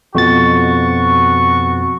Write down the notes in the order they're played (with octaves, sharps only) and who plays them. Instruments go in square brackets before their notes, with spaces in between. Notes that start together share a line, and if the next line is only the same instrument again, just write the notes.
[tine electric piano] F2 B2 A6 [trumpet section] F#4 C#6